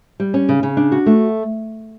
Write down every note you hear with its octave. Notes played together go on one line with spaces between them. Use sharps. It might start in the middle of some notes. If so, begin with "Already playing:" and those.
G3
C#4
C#3
C#3
D4
F#4
A3